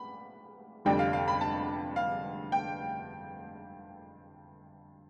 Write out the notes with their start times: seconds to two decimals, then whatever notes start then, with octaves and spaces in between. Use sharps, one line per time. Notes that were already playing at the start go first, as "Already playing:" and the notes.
Already playing: B5
0.85 F1 F2 D3 G3 D4 G5
0.99 F5
1.13 F5
1.28 B5
1.41 A5
1.96 F5
2.52 G5